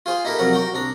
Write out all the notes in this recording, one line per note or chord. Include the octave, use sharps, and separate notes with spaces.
F4 G#4 C5
D#4 E4 G4 A4 A#4
C2 F2 F#3 A#4 F#5 A#5
F#4 G5 A#5
C2 D4 A#5